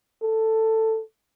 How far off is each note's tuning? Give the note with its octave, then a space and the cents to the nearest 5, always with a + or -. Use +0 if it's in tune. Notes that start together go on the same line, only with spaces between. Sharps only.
A4 +10